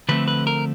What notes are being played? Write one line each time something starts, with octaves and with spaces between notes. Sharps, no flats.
D3 F3 A3 C4 B4
B4
A#4